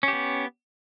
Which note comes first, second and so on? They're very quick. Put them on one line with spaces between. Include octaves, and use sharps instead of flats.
C#4 G4 B3